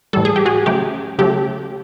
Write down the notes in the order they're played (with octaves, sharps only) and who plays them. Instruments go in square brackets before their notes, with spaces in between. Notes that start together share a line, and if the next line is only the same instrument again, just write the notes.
[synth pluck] A2 E3 G3 A4
G#4
G4
F#4 G#4
C#3 F#3 A3 G4
C#3 F#3 A3 G4